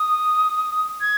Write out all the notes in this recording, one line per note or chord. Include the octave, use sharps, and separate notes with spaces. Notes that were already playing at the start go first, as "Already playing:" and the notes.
Already playing: D#6
G#6